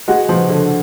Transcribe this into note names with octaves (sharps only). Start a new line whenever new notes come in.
G#3 F#4 F#5
F3
D3